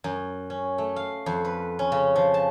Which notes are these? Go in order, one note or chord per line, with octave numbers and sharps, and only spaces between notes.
F#2
C#4
A3
F5
F2
B4
C#4
C#3
F3
A5